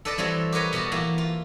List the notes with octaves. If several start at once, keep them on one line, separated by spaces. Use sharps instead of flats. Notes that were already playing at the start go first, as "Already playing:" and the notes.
A4 B4 D5 D#5 A5
E3 G3 C4 F#4 C#5
G4 A#4 B4 C#5 D#5
B2 B3 G4 A5
E3 A#3 F#4 G4
F4